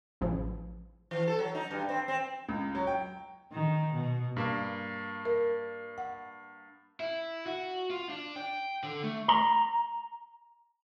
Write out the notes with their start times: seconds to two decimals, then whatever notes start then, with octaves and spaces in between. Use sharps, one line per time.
0.21 A1 C#3 E3 F3
1.11 E3
1.27 A4
1.39 F#3
1.55 D#4
1.71 G2
1.89 C4
2.08 C4
2.49 C#2
2.75 F#3
2.87 G5
3.53 D#3
3.94 B2
4.36 G2 A#3
5.25 A#4
5.98 F#5
7.00 E4
7.46 F#4
7.90 F4
8.09 D4
8.36 G5
8.83 D3
9.04 A3
9.28 A#5